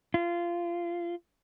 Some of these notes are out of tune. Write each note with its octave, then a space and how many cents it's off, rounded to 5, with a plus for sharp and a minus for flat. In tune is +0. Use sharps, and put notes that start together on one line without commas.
F4 -20